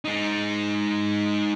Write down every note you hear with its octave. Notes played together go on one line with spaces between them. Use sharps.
G#3 D#4